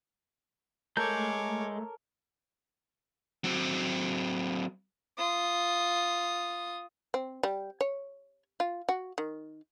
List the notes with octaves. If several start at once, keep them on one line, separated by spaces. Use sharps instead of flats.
G#3 A3 A4 A#4 C#5 D6 G6
F#3 C4
F4 D#6
C4
G3
C#5
F4
F#4
D#3